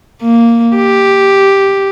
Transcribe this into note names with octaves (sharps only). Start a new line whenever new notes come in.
A#3
G4